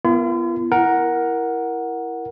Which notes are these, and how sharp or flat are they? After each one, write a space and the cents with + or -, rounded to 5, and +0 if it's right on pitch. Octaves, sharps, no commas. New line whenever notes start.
B3 +0 F4 -45 A#4 +0
E4 +10 A#4 +10 F#5 +0